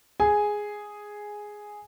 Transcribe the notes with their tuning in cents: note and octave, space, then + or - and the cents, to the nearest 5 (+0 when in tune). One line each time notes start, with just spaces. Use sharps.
G#4 +0 G#5 +0